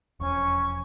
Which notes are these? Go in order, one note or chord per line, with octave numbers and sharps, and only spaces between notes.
E1 F2 C#4 C#6